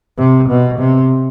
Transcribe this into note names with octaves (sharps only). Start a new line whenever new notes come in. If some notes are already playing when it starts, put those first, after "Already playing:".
C3
B2
C3